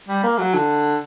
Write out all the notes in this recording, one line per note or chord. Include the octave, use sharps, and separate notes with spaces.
G3
A#3
F#3
D3